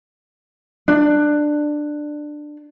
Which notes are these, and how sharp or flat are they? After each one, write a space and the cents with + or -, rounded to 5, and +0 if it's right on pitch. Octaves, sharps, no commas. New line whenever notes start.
D4 +15